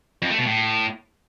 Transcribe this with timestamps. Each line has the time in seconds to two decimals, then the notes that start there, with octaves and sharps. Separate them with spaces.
0.22 F2
0.30 A3
0.38 B2
0.46 A2